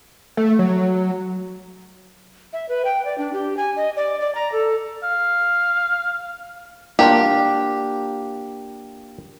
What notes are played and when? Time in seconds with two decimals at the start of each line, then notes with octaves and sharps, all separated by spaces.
0.37 A3
0.59 F#3
2.53 E5
2.69 B4
2.85 G5
3.05 D5
3.18 D4
3.33 G4
3.57 G#5
3.76 D#5
3.96 D5
4.21 D5
4.35 A#5
4.52 A4
5.03 F5
6.99 A#3 D4 F4 G4